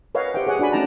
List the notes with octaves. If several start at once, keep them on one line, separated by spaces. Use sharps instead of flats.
A#4 B4 C#5 D#5 F5 F#5
G4 C5 E5 F#5 G5
G#4 C#5 F#5 G#5
D4 F#4 D5 G#5 B5
A3 C#4 D#4 G5 A5 A#5